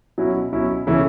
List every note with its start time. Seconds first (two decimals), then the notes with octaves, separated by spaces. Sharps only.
0.18 B2 F#3 C#4 E4
0.52 B2 F#3 C#4 E4
0.87 C#3 E3 A3 C#4 E4